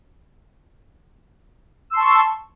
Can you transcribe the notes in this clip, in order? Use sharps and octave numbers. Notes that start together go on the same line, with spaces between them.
A5 C6 C#6 E6